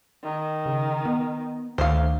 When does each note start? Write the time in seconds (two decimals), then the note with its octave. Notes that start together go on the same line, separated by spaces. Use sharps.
0.24 D#3
0.66 C#3
1.05 B3
1.78 D2 D#3 C5 F5